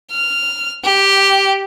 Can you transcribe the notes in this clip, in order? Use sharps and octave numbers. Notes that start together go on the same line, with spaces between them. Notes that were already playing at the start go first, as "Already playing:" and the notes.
F6
G4